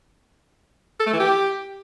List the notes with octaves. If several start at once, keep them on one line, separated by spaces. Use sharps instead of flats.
A4
A3
E3
G4